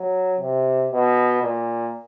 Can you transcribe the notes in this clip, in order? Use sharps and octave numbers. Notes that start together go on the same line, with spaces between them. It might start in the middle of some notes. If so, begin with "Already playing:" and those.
Already playing: F#3
C3
B2
A#2